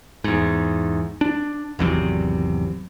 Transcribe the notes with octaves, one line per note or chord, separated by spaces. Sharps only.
E2 G#2
D4
G#1 E2 C3 F#3